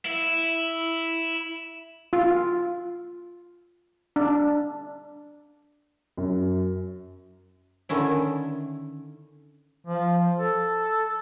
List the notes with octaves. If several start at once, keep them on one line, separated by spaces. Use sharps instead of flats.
E4
F4
D4
F#2
D3 D#3 C#4 E4
F3
A4